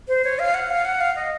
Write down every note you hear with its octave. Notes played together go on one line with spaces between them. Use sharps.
C5
C#5
F5
F#5
F5
F#5
F5
D#5